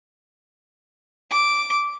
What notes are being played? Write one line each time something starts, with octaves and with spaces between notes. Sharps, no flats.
D6